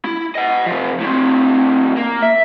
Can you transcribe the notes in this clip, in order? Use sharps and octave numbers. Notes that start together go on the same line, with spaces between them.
E4
D#5 F#5
C3 F3
A2 C4
A#3
E5